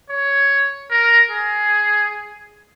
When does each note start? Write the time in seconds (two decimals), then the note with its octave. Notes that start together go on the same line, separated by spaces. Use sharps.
0.10 C#5
0.91 A#4
1.31 G#4